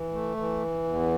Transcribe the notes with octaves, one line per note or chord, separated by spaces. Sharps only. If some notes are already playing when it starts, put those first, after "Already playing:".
Already playing: E3
A3
E3
E2